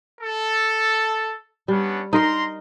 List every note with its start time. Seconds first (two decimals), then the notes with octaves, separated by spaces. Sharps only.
0.21 A4
1.68 G3 B3 C#4 D4
2.13 D#4 A#4 D#5 A#5 C6